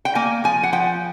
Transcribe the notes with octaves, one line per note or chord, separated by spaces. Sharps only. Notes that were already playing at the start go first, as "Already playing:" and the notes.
G5
A#3 G#5
F3 G#5
F#5
F3 G5